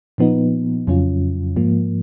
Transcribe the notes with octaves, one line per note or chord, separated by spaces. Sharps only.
A#2 F3 B3 D#4
F2 C#3 F#3 C#4 F4
G#2 F3 A#3